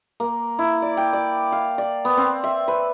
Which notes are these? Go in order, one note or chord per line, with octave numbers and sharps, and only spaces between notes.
A#3
E4
D5
G5
D5
F5
D5
B3
C4
E5
B4